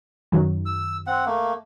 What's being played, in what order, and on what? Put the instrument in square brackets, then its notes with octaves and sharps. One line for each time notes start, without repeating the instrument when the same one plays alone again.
[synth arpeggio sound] F#2 D#3 F#3
[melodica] E6
C4 F#5
A3 A#3